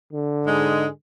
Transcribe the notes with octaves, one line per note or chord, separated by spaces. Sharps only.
D3
G#2 G#3